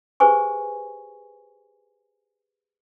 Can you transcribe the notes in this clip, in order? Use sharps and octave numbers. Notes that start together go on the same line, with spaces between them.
G4 G#4 B4 C5 G#5 C#6